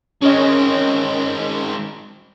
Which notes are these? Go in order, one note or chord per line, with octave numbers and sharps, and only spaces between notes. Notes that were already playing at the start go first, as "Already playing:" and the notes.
G#3 C4 C#4 A#4 D#5